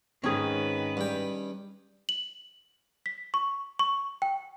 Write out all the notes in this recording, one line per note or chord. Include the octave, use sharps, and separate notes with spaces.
G#2 D#3 C4 C#4 G#4 B4
G2 G5
F#7
B6
C#6
C#6
G5